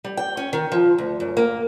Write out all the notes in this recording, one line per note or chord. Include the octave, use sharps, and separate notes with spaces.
G3
G5
C#4
D#3
F3
D2
F#2
A#3